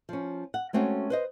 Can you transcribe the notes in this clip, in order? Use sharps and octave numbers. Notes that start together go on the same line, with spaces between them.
F3 C#4
F#5
G#3 A3 C4 C#4 F#4
B4 C5 D#5